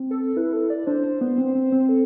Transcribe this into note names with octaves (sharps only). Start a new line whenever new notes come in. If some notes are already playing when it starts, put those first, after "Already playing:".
Already playing: C4
A4
E4 B4
A4
D5
D4 C5
B3
C4
C4
C4
A4